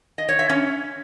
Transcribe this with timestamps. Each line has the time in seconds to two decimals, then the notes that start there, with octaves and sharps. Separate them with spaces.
0.18 D#5
0.29 C#5
0.39 E5
0.49 C#4